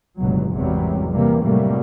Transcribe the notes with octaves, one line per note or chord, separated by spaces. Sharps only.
G1 C#2 B2 F#3
G#1 E2 C3 F#3 G3
C3 E3 G3 A#3
A2 C3 F#3 G3 A3 A#3